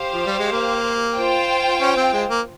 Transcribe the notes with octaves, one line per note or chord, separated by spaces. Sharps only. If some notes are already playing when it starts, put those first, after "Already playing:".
Already playing: G4 C5 F5
F3
G3
G#3
A#3
F4 C5 G5
C#4
C4
G#3
A#3